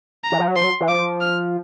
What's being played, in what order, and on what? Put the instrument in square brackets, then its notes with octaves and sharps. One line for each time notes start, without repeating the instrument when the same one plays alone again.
[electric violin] A#5
[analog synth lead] E3
F3
F#3
[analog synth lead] F3 [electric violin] C6
[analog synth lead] F#3
E3
[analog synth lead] F3 [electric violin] D6
[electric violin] F6